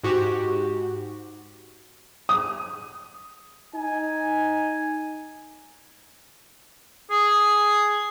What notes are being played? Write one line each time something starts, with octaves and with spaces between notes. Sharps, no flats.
G#2 F#4 G4
D#6
D#4 G#5
G#4